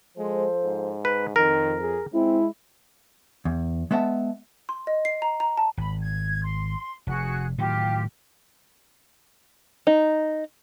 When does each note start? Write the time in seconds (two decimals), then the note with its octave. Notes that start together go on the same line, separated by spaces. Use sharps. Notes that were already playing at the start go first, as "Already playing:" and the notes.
0.18 F3 G#3 A4 C5
0.64 G#2
1.05 B4
1.36 F2 D#3 A#4
1.81 G#4
2.14 G#3 C4 E4
3.45 E2
3.91 G#3 B3 E5 F#5 A5
4.69 C6
4.87 D#5
5.05 C7
5.22 A#5
5.40 A#5
5.57 A5
5.77 G#1 B5
6.01 G#6
6.42 C6
7.07 F1 F#4 G#4 F#6
7.58 A2 D#3 F#3 F4 G4
9.87 D#4